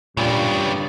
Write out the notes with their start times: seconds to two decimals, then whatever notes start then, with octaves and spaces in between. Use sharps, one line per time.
0.17 G2 A#2 C#3 G3 D5